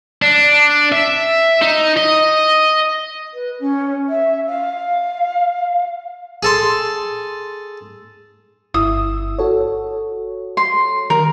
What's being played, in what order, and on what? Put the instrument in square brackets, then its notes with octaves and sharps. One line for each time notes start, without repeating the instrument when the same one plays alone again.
[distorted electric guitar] D4
E5
D#4
D#5
[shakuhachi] B4
C#4
E5
F5
[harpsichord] G#4 A4 C6
[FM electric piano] G1 E4 E6 [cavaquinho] D#6
[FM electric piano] F#4 A4 C#5
[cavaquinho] C6
[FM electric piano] D#3 [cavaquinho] A#4